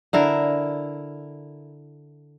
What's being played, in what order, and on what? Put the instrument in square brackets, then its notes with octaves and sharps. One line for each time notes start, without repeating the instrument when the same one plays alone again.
[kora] D3 E4 A#4